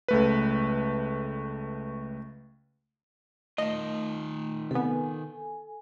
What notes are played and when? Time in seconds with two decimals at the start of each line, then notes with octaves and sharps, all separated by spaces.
0.08 C#2 A3 B4
3.58 D#3 A3 F4 D#5
4.71 C3 B3 A4 G#5